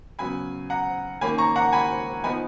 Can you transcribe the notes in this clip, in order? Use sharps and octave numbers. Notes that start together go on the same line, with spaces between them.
C#3 F#3 B3 G#5 B5
F#5 A#5
D#3 A#3 C#4 G#5 B5
A#5 C#6
F#5 A#5
G#5 B5
F3 B3 D#4 G#5 B5